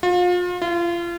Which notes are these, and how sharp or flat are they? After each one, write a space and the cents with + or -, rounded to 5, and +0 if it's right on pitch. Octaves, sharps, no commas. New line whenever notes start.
F4 +35
F4 -30